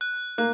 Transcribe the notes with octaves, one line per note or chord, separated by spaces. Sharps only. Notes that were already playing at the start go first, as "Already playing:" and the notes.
F#6
A#3 F#6